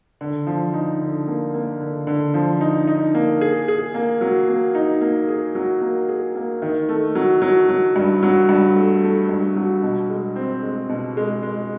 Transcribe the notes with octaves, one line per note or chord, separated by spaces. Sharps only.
D3
F3
D#4
D3
A#3
A#3
D3
D3
F3
D#4
D#4
A#3
G#4
G#4
A#3
F#3
A#3
D#4
A#3
G#4
F#3
A#3
G#4
A#3
D#3
A3
F#3
F#3
F#3
G2
F#3
G2
A3
A3
G2
F#3
B2
G#3
C4
G#3
B2
G#3
G#3